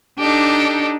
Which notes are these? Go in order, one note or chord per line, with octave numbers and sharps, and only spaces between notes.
D4 D#4 G4 A4